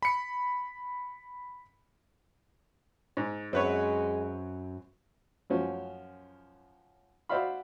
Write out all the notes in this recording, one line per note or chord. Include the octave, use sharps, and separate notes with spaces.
B5 C#7
G#2
F#2 G#3 C4 B4 C#5
F#2 F3 C#4
F#4 C5 D5 E5 F5 B5